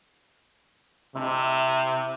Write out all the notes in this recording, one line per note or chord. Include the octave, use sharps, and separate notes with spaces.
C3 E4 A5